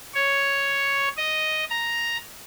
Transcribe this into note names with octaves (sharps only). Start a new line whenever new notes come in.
C#5
D#5
A#5